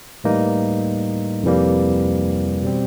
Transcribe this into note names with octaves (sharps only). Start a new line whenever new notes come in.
A2 E3 G3 A#3 D#4
F2 C3 E3 G3 A#3
B2 G3 C4